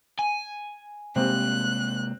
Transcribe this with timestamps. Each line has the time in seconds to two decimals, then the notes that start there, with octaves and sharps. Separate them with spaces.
0.19 G#5
1.16 C3 G3 G#3 A#3 C4 F#6